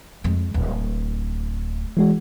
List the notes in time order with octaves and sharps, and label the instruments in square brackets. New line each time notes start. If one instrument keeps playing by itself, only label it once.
[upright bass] F2 G#3
D1
[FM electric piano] E3 G#3 F#4